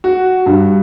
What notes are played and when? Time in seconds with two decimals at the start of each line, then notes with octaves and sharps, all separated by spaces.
0.04 F#4
0.46 G2